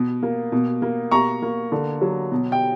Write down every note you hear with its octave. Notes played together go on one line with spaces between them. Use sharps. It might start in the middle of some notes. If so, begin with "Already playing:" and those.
Already playing: B2
A#3
B2
A#3
B2 A#5 C#6
A#3
D3
F#3
B2
G5